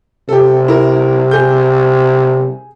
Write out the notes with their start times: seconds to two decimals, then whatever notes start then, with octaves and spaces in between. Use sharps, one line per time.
0.29 C3 G4 A4
0.68 E4 A#4
1.31 G#4 G6